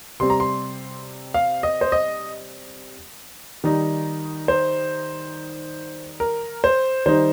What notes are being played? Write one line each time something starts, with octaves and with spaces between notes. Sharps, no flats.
C3 G3 C4 C6
A#5
C6
F5
D#5
C5
D#5
D#3 G3 D#4
C5
A#4
C5
D#3 G3 D#4 C5